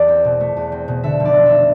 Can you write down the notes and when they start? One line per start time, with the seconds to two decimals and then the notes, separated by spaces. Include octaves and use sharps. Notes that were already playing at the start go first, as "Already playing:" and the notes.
Already playing: E2 A3 D5
0.08 C4
0.25 B2
0.40 A3
0.57 E2
0.72 C4
0.88 B2
1.03 D3 E5
1.20 F1
1.25 D5
1.35 F1
1.45 E5